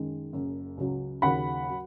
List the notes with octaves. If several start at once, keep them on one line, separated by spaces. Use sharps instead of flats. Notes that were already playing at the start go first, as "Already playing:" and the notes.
Already playing: F#2 D#3 G#3
F#1 F#2 C#3
C#2 C#3 F#3
D#2 C#3 F#3 F#5 B5
F#3